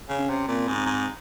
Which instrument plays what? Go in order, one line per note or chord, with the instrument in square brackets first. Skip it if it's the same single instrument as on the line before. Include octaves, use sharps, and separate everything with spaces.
[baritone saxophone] C#3
[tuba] C#4
[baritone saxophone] C3
[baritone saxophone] A#2 [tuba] C4
[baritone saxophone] G#2
[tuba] C4
[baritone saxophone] G#2